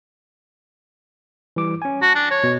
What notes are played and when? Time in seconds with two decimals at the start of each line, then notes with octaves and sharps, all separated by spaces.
1.56 E3 G3 D6
1.82 C#4 G#5
2.02 F#4 A5
2.15 D4
2.31 C#5
2.44 B2